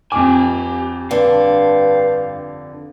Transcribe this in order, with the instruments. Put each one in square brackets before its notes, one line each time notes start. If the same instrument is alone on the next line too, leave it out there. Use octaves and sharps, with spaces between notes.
[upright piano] F2 D6 [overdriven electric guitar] G4 G#5
[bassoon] G2 [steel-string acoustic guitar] D3 [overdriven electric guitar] F5